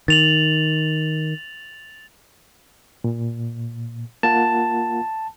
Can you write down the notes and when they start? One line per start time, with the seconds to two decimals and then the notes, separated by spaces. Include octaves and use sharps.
0.08 D#3 A6 F7 F#7
3.04 A#2
4.23 A#3 F4 F#5 A5